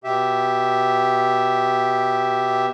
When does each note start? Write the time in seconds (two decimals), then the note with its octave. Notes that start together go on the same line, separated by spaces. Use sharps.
0.04 B2 G4 E5